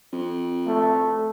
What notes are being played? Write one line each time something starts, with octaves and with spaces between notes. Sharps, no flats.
F2
A3